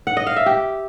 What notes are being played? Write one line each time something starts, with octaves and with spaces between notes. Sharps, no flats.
F#5
D#5
F5
E5
G4